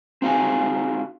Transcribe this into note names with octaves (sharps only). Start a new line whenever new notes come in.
C4 D#4 F4 F#4 G#4 G#5